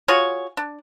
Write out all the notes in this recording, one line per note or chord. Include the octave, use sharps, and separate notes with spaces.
F4 F#4 G#4 C#5
D4